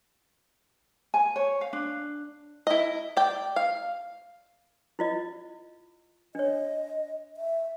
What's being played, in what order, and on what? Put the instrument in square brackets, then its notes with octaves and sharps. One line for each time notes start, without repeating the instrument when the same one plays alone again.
[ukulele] G#5
C#5
F5
D4
[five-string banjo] E4 D#5
D5 G5
F5
[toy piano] E4 F4 D#5
[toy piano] D4 C#5 [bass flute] D#5
[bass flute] E5